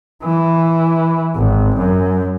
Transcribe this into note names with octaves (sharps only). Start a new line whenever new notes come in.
E3
G#1
F#2